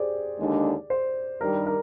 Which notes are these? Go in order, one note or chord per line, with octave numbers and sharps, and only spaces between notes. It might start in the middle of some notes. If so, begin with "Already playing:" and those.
Already playing: G4 G#4 C5 D5
D#2 D3 G#3 D4
C5
G2 D#3 G3 A#4
A#4